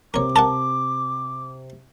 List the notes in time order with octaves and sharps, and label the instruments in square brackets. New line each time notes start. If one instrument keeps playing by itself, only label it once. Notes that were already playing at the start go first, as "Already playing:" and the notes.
[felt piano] C3 C4 [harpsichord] A#4 C#5 [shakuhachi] D6
[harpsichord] A4 A#4 F#5 [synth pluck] A5